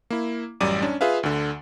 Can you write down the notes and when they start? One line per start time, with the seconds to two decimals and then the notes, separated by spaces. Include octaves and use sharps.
0.10 A#3 E4
0.60 A1 F#2 G3 D5 D6 D#7
0.82 C#4 D4
1.01 F4 G#4 B4 E5 F5
1.23 D2 D3